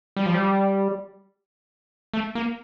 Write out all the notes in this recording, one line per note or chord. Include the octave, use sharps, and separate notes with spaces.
G3
F3
G3
A3
A#3